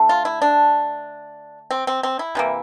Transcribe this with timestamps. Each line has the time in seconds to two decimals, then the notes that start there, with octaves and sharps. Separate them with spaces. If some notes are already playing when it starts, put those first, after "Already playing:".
Already playing: D3 A3
0.09 F4
0.25 E4
0.42 D4
1.71 C4
1.87 C4
2.03 C4
2.19 E4
2.35 C3 E3 A#3